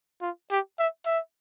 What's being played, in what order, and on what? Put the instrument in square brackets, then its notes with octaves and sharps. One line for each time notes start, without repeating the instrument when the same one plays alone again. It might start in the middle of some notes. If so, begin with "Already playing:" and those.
[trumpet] F4
G4
E5
E5